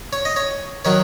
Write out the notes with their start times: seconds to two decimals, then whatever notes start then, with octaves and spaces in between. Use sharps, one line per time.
0.13 C#5
0.25 D#5
0.36 C#5
0.85 D#3 F#3 C#5